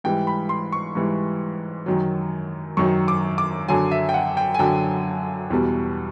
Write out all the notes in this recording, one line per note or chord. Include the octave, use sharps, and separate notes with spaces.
G#2 E3 G3 G5
B5
C6
C#6
G#2 E3 G3
F#2 D#3 F#3
F#2 D#3 F#3 C#6
D6
D6
F#2 D3 F#3 G#5
E5
G5
F#5
G5
G#5
F#2 D3 F#3 G5
E2 B2 G3